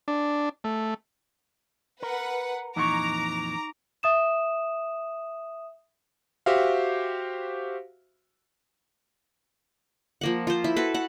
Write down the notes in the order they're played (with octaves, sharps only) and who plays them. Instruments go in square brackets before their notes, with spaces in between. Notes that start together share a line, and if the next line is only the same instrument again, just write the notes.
[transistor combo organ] D4
A3
[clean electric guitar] A#4 [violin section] B4 F#5
[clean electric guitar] F2 A#2 E3 [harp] D#4 C#6 [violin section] A#5 [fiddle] D6
[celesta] E5 D#6 E7
[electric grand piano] F#4 G4 C5 E5 F5
[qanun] F3 A#3 F#5
F4 C5
E4
F#4 A4 B4
A4 F#5